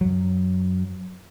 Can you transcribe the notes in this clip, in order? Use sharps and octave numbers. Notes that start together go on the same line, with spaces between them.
F#2 F#3